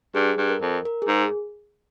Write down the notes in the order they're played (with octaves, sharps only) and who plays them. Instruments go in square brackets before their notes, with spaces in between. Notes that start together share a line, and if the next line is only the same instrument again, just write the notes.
[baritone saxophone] G2 [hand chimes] G#4
[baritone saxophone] G2
[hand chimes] A#4
[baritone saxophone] F2
[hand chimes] A#4
G#4
[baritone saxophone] G#2